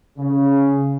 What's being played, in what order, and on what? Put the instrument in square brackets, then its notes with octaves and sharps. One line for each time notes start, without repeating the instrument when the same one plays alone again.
[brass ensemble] C#3